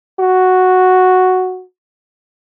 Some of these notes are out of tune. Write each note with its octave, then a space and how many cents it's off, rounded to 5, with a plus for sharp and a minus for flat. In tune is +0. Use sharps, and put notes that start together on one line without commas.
F#4 +0